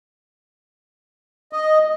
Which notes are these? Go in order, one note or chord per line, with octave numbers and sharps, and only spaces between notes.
D#5